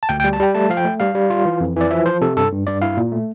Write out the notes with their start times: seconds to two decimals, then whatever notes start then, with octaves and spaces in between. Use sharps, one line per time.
0.03 A5
0.09 D2 G5
0.20 G5
0.24 G3
0.33 A5
0.40 G3 G5
0.55 A3 A5
0.70 F3 F5
0.77 G5
0.85 A3
1.00 G3 F5
1.15 G3
1.30 F4
1.45 E3
1.60 F2
1.76 E3 D5
1.91 F3 E5
2.06 F3 C5
2.21 C3 A4
2.37 G2 A4
2.52 G2
2.67 G2 D5
2.82 E4 F5
2.97 A#2
3.12 A3